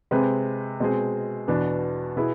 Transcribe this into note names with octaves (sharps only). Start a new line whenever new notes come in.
C3 G#3 C4 G#4 B4
B2 G#3 C4 G#4
E2 B2 B3 D4
B2 B3 E4 G#4